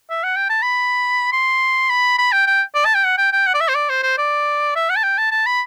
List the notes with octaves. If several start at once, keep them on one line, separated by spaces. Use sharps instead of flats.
E5
F#5
G5
A5
B5
C6
B5
B5
G5
G5
D5
A5
G5
F#5
G5
G5
F#5
D5
E5
C5
D5
C5
C5
D5
E5
F#5
A5
G5
A5
A5
B5